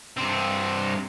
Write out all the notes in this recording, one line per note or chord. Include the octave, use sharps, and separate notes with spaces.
G2 C4